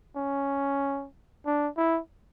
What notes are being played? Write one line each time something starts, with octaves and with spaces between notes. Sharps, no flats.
C#4
D4
E4